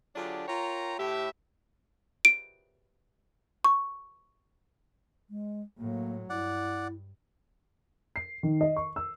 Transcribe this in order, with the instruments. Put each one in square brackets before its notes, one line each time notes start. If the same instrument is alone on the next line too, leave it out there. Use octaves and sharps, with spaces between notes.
[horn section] D3 F#3 D4 F4 G4 G#4
F4 A#4 C#5 G5 A#5
A2 G4 E5
[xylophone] D7
C#6
[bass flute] G#3
[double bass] A2 F#3 [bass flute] A#3
[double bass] G2 [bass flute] E4 [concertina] D5 F#5
[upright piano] C7
D#3
D#5
C#6
E6